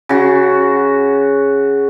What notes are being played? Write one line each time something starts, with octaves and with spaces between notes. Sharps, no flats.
C#3 F#4